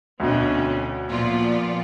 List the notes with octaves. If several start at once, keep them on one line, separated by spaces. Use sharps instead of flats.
D2 B2 D3 C4 C#4
A#2 F3 B3 F4 D5